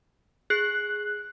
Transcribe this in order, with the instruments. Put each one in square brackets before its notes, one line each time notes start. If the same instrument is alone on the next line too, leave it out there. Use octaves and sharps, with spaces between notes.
[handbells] G#4 C7 [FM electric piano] F#6